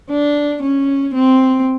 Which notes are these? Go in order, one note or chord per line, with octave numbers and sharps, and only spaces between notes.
D4
C#4
C4